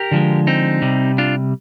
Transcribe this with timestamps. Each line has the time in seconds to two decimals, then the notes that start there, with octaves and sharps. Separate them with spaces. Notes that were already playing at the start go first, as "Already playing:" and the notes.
Already playing: G4 A#4
0.11 D3 F3 G#3
0.47 C4 D#4
0.82 C3 G3
1.18 D4 F4